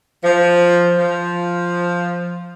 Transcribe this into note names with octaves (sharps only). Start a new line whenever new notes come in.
F3
F3